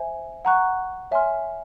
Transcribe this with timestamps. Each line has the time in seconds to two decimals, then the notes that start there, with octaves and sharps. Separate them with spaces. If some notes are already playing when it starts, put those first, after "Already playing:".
Already playing: C5 E5 G#5
0.45 F#5 A#5 C#6 F#6
1.11 C#5 E5 G#5 C6 F6